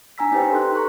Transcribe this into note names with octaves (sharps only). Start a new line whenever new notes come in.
D4 G#5 A#5 E6 B6
C#4 D#4 G4 B4 C5 G5
A4 C6 F#6
A#5 C#6 F#6